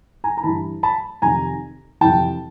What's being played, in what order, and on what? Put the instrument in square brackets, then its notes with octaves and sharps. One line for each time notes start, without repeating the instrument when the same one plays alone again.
[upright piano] G#5 A#5
A#5
G2 E3 A5 B5
A5 B5
F2 C3 D#3 G#5 A#5
F2 C3 E3 G5 A5